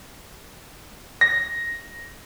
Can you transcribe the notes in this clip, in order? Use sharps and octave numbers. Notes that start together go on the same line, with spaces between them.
A#6